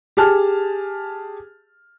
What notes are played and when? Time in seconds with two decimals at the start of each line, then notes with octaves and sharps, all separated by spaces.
0.17 G4 G#4 A5 F6